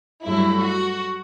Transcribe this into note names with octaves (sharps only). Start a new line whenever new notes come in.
G2 F#3 A3 E4
F#4